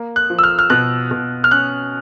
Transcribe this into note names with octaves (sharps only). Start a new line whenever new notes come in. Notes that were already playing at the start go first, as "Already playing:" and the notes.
Already playing: A#3
F#6
F3
E6
F6
F6
B2 F#6
B2
F6
C#4 F#6